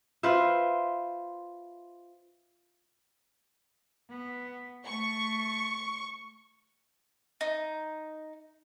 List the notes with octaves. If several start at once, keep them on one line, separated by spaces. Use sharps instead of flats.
F4 B4 C5 E5
B3
A3 C#6
D#4